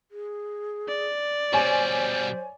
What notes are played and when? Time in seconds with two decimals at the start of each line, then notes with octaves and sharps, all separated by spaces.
0.11 G#4
0.89 D5
1.53 B2 G3 C5 C#5 G#5